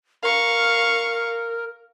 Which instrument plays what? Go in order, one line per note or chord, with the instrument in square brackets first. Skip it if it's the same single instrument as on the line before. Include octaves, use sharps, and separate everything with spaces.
[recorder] A#4 [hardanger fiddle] F5 C#6